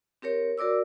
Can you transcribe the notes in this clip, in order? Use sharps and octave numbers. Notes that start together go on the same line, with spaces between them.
C4 G4 A#4 C#5
F#4 A#4 D5 D6 E6